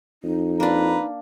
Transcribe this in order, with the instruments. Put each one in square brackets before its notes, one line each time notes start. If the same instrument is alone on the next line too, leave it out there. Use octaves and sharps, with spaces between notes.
[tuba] F2 [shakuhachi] D#4
[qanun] A#3 D4 [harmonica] B4 A#5